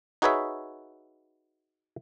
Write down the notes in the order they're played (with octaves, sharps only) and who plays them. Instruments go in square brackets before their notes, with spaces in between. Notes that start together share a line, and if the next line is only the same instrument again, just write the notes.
[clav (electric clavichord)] D#4 F#4 G#4 B4 C#5 E5